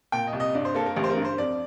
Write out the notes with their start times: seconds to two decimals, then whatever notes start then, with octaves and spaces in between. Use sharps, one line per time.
0.12 A#2 G5
0.27 D#5
0.33 C2
0.40 D#5
0.55 G2 D5
0.65 C5
0.75 A#3 A4
0.86 A#4
0.96 A1 G4
1.04 C5
1.10 A#4
1.17 G2
1.25 C5
1.38 F2 D5